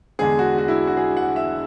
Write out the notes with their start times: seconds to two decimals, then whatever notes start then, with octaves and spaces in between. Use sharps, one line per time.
0.19 E2 D3 G#3 G#4
0.39 F#4
0.58 F#4
0.68 E4
0.87 F#4
0.97 G#4
1.17 F#5
1.36 E5